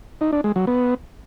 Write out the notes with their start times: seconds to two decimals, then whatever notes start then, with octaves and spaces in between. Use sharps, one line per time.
0.21 D#4
0.33 D4
0.44 G#3
0.56 F#3
0.67 B3